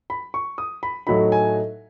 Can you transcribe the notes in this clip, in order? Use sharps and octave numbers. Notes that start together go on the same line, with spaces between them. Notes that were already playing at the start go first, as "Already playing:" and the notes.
B5
C#6
D#6
B5
A2 F#3 A3 D#4 B5
G#5